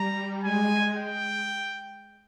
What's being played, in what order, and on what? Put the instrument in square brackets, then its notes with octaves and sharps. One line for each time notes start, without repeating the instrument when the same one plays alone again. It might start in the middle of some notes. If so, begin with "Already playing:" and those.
Already playing: [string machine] G3 [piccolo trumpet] A#5
[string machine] G#3 [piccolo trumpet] G#5
[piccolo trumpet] G5